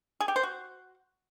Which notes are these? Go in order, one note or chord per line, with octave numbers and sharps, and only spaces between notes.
G#4
G4
C5
F#4